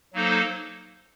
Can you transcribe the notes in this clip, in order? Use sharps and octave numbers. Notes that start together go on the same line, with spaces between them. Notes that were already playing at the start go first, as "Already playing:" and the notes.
F#3 A#3 D#4 A4 C5